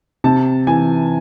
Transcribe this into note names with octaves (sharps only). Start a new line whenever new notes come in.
C3 A5
E3 G#5